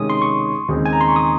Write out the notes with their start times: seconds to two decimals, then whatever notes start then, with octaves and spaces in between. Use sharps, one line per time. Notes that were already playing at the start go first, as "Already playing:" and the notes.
Already playing: C3 D#3 G#3 C#4 D#6
0.10 C6
0.22 C#6
0.69 D#2 C#3 G#3 C4 D#4
0.86 G#5
0.93 A#5
1.01 C6
1.08 C#6
1.16 D#6